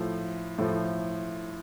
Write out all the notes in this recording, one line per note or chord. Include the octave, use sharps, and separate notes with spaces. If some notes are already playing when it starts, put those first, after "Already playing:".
Already playing: A2 F3
A2 F3